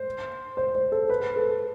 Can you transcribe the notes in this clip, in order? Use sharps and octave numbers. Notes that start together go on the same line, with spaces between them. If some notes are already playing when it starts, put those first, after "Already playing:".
Already playing: C5
C5
C5
A4
B4
A4